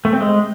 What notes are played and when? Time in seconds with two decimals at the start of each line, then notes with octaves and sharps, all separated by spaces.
0.05 A3
0.13 C4
0.21 G#3